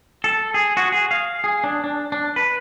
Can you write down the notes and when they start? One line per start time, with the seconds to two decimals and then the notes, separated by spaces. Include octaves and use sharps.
0.24 A4
0.54 G#4
0.77 F#4
0.92 G#4
1.11 F5
1.44 G#4
1.64 D4
1.84 D4
2.12 D4
2.36 B4